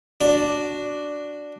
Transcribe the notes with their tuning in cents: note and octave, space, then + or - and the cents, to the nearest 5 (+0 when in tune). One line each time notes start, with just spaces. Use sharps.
D4 +0 F#4 +0